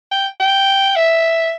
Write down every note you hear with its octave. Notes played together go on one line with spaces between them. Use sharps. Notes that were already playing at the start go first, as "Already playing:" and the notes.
G5
G5
E5